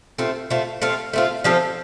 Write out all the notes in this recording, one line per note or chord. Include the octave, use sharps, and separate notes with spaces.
A3 C4 F4
A3 C4 F4
A3 C4 F4
A3 C4 F4
F3 C4 F4 A4